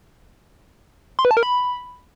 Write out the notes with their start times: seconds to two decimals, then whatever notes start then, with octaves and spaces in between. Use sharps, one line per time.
1.19 C6
1.25 B4
1.31 A5
1.37 A#4
1.43 B5